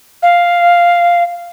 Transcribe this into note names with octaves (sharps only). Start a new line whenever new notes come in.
F5